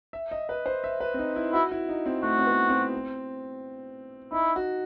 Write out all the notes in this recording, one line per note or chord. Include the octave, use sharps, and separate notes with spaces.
E5
D#5
B4
C5
E5
B4
C4
D#4
E4
E4 F#4
E4
D#4
C4
A3 F#4
C4
B3
C4
D#4 E4
F#4